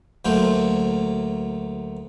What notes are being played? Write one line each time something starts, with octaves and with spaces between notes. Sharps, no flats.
D2 F#3 A3 A#3 C5